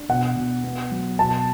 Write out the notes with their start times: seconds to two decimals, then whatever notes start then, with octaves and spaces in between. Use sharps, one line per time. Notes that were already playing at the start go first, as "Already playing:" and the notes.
Already playing: D4
0.09 B2 F#5
0.36 B2
0.64 B3
0.92 F#3
1.19 B2 A5